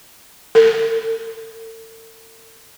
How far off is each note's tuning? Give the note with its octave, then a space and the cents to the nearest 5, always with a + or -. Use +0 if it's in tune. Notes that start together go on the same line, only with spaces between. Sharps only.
A4 +40